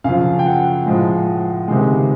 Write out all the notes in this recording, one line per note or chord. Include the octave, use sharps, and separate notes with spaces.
F#2 C#3 F3 F5
G5
F#5
A2 F3 G#3
C#2 C3 D#3 G#3